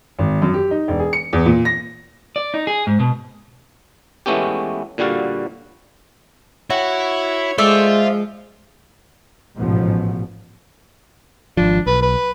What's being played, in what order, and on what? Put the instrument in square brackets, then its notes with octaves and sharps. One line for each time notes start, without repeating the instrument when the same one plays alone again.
[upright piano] G#1
F#2
G4
D#4
E1
G#4
C#7
E2
A#2
A#6
[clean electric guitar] D5
D#4
G#4
G#2
B2
[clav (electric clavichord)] E3 G#3 A3 B3 C#4 G4
A#2 D3 G3 F#4 F5
[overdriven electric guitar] E4 [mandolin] F#4 [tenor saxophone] C#5
[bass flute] G#3 [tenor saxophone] A3 [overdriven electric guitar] F4 [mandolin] C5 D5 E5
[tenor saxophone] F3
[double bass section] A1 G#2 B2 F3 B3
[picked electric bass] G#1 F3 [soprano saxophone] D4
[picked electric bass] B1 [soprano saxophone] B4
[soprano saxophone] B4